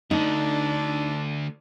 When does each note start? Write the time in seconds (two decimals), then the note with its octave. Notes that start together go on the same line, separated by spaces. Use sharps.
0.11 D2 D3 D4 D#4